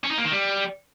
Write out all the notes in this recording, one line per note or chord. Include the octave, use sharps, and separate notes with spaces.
C#4
D#4
A#3
D#3
G3